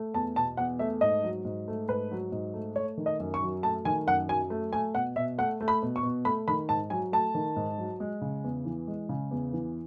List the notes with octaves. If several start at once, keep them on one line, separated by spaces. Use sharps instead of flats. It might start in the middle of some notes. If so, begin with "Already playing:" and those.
Already playing: A3
E2 A5
B2 A5
E2 F#5
A3 E5
G#2 D#5
F#3
G#2
A3
G#2 B4
F#3
G#2
A3
A3 C#5
D#3
D#5
F#2
C#6
F#3
A3 A5
D#3 G#5
F#2 F#5
F#3 G#5
A3
A3 G#5
B2 F#5
B2 E5
A3 F#5
A3
B5
B2
C#6
B2
A3 B5
D#3 B5
G#2 A5
F#3 G#5
A3 A5
D#3
G#2
F#3
G#3
C#3
E2
E3
G#3
C#3
E2
E3